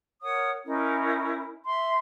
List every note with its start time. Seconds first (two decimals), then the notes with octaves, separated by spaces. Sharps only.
0.23 A#4 C#5 F#5 D#6
0.65 C#4 D#4 E4 A#4
1.65 E5 C6